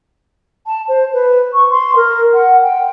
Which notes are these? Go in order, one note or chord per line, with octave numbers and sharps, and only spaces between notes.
A5
C5
B4
C#6
C6
A#4
F#5
G5